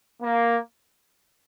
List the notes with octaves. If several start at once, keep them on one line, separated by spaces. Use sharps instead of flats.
A#3